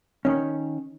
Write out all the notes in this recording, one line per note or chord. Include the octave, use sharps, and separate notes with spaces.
D#3 C#4